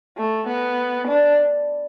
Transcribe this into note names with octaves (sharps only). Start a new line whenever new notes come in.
A3
B3
D4